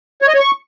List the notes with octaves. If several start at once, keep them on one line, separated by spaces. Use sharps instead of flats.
C#5
D#5
C#5
C#6